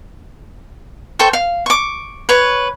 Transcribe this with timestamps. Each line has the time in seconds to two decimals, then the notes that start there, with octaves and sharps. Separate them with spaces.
1.19 A4 C5 G5 C#6
1.33 F5
1.66 C#6 D6
2.29 B4 C#5